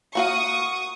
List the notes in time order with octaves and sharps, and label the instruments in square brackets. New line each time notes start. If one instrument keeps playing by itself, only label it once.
[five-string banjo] A#3 F#4 F5 [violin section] C#6 D#6